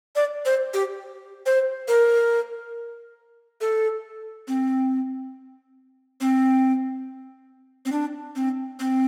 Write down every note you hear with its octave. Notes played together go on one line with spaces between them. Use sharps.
D5
C5
G4
C5
A#4
A4
C4
C4
C4
D4
C4
C4